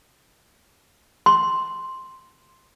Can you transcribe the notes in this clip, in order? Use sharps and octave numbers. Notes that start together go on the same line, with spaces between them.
C6